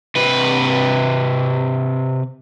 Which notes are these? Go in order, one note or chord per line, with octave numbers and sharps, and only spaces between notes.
C3 B4